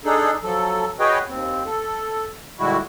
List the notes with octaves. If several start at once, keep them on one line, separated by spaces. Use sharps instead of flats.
D4 D#4 G#4 A4
F3 F#3 A4
F#4 G#4 B4 C#5 D#5 G5
D#2 C4
A4
A#2 D3 G3 G#3 E4 F#4